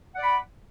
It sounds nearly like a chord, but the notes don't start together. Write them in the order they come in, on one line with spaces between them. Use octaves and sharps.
F#5 D5 B5